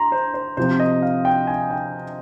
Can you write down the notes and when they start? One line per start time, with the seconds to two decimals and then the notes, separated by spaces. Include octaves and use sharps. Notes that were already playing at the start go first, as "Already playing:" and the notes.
Already playing: A#5 C6
0.12 C5
0.34 C5
0.57 C3 F3 C4 C5
0.80 D#5
1.02 F5
1.25 G5
1.47 G#5
1.71 G5